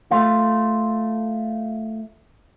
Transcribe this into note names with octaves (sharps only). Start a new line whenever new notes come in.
A3 F4